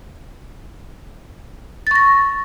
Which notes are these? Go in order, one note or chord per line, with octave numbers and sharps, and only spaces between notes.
C#6 A6 A#6